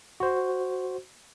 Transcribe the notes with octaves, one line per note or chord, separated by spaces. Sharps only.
F#4 C5